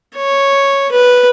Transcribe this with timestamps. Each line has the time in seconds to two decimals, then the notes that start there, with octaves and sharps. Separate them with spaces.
0.16 C#5
0.92 B4